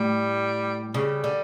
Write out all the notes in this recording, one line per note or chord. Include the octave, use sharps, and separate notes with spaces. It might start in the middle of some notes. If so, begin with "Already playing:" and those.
Already playing: A2 G3
C#3 G3
D3